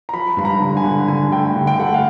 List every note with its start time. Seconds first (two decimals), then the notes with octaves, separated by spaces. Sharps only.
0.09 A#5
0.13 F3 B5
0.37 G2 B5
0.45 A#5
0.60 D3
0.77 G#5
0.84 D3
1.08 D3 G#5
1.31 A3 G5
1.56 D3
1.67 G5
1.79 A3 F#5
1.94 F5